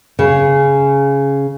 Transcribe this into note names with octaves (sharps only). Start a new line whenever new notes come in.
C#3